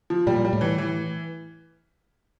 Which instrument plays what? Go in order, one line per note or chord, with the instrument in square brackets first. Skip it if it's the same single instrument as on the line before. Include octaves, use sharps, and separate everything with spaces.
[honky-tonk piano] F3
[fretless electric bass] A#2 [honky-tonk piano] G3
[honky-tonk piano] G3
[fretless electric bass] A2
[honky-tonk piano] E3
E3